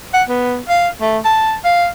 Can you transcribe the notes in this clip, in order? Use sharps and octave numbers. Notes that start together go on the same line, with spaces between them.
F#5
B3
F5
A3
A5
F5